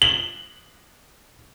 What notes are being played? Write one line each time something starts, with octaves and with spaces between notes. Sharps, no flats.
F#7